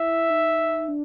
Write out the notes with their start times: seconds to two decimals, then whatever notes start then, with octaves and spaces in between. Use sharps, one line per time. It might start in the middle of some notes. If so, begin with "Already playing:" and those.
Already playing: E4 E5
0.30 D#4
0.88 D4